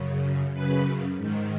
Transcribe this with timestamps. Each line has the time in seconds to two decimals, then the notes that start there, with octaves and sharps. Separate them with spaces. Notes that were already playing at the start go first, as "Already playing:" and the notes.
Already playing: F#2 C#3
0.53 F#2 C#3 B4
1.17 G#2 D#3